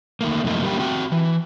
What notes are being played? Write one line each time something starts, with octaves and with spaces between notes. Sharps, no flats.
D#3 A3 A#3
F#2 C3 F3 A3 A#3 D#4
G3 A#3 D4 G4
C4 F#4 G5
E3